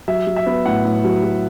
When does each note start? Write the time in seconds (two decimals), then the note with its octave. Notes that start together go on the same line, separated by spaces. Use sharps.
0.08 F#3 E5
0.27 F#3
0.36 E5
0.46 B3
0.65 A2 F#5
0.85 A2
1.04 F#3
1.24 F#3